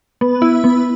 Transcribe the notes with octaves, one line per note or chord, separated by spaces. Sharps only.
B3
E4
B3